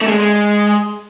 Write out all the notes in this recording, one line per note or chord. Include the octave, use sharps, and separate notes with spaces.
A3
G#3
G#3